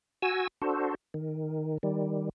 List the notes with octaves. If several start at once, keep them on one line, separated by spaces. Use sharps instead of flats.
F#4 G#5 E6
D4 F#4 A4 C5
D#3
D#3 G3